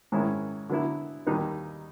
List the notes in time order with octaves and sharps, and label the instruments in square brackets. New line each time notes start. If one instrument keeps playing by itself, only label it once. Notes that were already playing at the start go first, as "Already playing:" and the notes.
[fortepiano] G#2 D#3 G#3 C#4 E4
D3 F#3 B3 E4
D#2 D#3 G3 B3 D#4